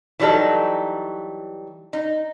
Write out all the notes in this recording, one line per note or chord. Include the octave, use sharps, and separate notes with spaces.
E3 F#3 G3 D#4 A4
D#4